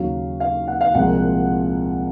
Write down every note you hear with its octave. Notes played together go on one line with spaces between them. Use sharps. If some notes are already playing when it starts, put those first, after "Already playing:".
Already playing: D#2 C#3 F#3 F5
F5
F#5
F5
C2 A#2 F3 G#3 F#5